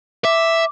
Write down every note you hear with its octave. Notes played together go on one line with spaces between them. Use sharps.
E5 D6